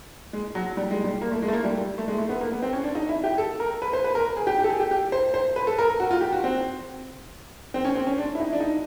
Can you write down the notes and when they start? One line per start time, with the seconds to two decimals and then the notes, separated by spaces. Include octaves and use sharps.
0.33 G#3
0.55 F#3
0.77 G3
0.91 G#3
1.04 G3
1.21 A#3
1.31 A3
1.42 G#3
1.48 A3
1.53 A#3
1.64 G3
1.98 A3
2.08 G#3
2.18 A3
2.29 B3
2.41 A#3
2.52 B3
2.62 C4
2.73 C#4
2.84 D4
2.95 D#4
3.09 E4
3.24 G4
3.38 A4
3.60 A#4
3.82 B4
3.93 C5
4.04 B4
4.15 A#4
4.37 G#4
4.47 G4
4.59 G4
4.64 A4
4.69 G#4
4.80 G4
4.91 G4
5.12 C5
5.34 C5
5.56 B4
5.67 A4
5.79 A#4
6.00 F#4
6.11 F4
6.21 G4
6.33 F#4
6.44 C4
7.74 C4
7.85 C#4
7.95 C4
8.07 C#4
8.18 D4
8.35 E4
8.40 D#4
8.53 D4
8.60 D#4